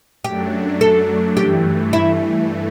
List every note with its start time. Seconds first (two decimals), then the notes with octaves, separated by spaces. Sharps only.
0.24 F#2 F#3 A3 D4 G4
0.81 A4
1.37 G2 E3 A3 G4
1.93 E4